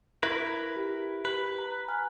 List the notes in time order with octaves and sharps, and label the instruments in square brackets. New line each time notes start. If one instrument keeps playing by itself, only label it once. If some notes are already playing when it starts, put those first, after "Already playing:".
[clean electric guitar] E4 A#4 B4
[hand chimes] G4
[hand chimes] G4 [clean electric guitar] B4
[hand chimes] A#5
G#5 F6 F#6